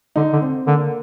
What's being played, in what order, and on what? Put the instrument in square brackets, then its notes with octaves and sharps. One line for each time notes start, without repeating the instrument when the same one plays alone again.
[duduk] D3 [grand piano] D#4
[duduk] D3
[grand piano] C4
[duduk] D3 [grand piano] A#3